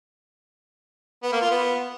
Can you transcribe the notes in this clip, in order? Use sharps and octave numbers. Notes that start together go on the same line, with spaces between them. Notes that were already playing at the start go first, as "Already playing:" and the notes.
B3
A#3
F4
B3